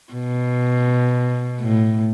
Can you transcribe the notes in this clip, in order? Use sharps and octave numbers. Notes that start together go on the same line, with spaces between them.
B2
A2